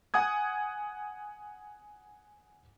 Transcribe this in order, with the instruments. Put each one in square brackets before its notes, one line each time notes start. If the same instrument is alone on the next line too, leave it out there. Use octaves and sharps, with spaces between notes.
[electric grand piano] F#5 G#5 D#6 G#6